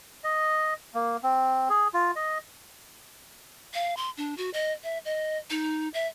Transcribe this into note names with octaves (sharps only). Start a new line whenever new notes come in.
D#5
A#3
C4
G#4
F4
D#5
F5
C6
D4
F#4
D#5
E5
D#5
D#4
E5